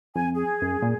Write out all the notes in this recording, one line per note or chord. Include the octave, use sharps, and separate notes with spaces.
F2 G#5
G#4
F#2
A#2